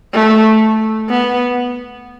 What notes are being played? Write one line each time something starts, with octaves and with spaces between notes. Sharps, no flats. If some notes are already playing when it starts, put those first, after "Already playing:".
A3
B3